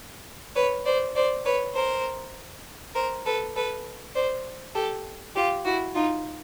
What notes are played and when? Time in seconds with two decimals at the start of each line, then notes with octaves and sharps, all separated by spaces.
0.55 B4 C#5
0.85 C5 D5
1.15 C5 D5
1.45 B4 C#5
1.75 A#4 C5
2.95 A#4 C5
3.25 A4 B4
3.55 A4 B4
4.15 C5 D5
4.75 G4 A4
5.35 F4 G4
5.65 E4 F#4
5.95 D#4 F4